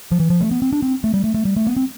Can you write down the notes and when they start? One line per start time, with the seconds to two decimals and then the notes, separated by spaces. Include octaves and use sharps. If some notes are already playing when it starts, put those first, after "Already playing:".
0.12 F3
0.20 E3
0.30 F3
0.41 A3
0.51 B3
0.62 C4
0.73 D4
0.82 C4
1.04 A3
1.14 G3
1.24 A3
1.34 A3
1.45 G3
1.56 A3
1.67 B3
1.77 C4